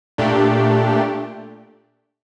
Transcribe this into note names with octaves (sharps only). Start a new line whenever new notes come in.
A#2 A3 D4 G4